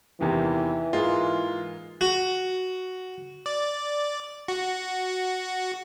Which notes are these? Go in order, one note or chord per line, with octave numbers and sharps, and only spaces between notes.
E2 C3 D#3 E3
G#2 G#3 A#3 F4
F#4
D5
F#4